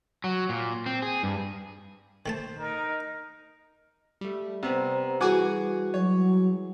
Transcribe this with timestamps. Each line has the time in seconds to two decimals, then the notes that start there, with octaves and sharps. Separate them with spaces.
0.24 F#3
0.49 A#2
0.86 C4
1.02 G#4
1.23 G2
2.26 D#3 A3 C5 A5
2.59 D#4 A#4
4.21 G3 A3
4.63 C3 G3 B3 C4 C5 A#5
5.20 E3 G3 F#4 G#4 F#5 G#5 D6
5.94 F#3 C#5